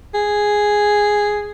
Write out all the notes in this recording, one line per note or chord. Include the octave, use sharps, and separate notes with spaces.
G#4